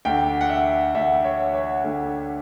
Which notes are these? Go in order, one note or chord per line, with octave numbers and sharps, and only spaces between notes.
D2 D3 G5
F#5
E5
D2 D3 E5
C#5
C#5
D2 D3 A4